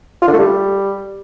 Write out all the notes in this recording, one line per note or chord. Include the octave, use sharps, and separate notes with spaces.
F4
D3
A3
G3